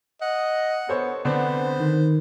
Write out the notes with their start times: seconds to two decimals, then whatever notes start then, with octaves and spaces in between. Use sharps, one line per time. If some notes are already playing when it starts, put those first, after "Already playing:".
0.22 D#5 F#5
0.89 B3 A4 C5 C#5
1.25 D3 B3 C4 D4 C5
1.80 D#3